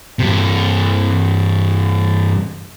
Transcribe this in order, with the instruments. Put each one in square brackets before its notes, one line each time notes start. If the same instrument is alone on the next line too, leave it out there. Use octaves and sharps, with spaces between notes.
[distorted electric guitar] G2 C3